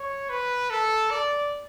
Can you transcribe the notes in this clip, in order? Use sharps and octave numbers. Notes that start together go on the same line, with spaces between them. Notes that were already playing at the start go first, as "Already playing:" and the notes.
Already playing: C#5
B4
A4
D5